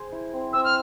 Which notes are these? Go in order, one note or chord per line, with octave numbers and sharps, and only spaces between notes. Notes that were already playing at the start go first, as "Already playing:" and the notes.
Already playing: G#4 C5
E4
C4
C4 E6
F6